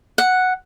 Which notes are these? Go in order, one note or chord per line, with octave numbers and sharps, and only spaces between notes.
F#5